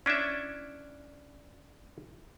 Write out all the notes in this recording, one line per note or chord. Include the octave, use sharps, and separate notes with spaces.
C#4 D4 E4 E5